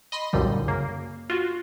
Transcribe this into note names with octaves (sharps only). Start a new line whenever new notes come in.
D#5 B5 C6
C2 F#2 A#2 D3 D#3 G3
F#2 C#3 A#3
F4 F#4